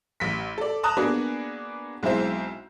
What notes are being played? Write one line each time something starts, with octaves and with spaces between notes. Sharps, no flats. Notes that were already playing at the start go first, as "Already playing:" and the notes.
A1 B6
A4 D5
A5 A#5 D#6 F#6
A#3 B3 D4 F#4 G#4
B1 G#3 C4 E4 C5